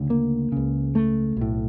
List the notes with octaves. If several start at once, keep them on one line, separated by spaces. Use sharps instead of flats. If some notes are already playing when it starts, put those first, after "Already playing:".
Already playing: D2 C#3
A#3
C#2 C#3
A3
B1 A2